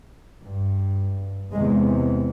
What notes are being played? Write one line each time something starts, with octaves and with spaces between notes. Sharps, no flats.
G2
E2 C3 G#3